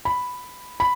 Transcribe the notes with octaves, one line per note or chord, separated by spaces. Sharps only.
B5
B5